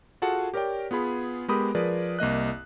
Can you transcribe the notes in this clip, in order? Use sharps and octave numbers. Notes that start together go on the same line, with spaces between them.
F4 F#4 G#4 A4 F#5 A5
G4 A#4 C#5 D5 G5
B3 F4 G#4 B5
G#3 B3 G4 A#4 B5 D#6
F3 G#4 A#4 B4 D5
C2 A#3 D#5 F#6